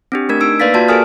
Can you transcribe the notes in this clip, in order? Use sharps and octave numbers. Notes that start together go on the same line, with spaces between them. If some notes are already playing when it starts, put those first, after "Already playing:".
C4 D4 G4
A3 D4 A#4 G#6
D#4 E6 D7
A#3 B4 D5 F5 A6 B6
A#3 F4 F#4 D5 A5
G4 A4 A#4 G#5 D#6 F6